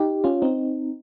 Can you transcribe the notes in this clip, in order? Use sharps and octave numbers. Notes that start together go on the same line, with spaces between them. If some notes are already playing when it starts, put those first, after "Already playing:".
Already playing: D#4 G4
C#4 F4
C4 D#4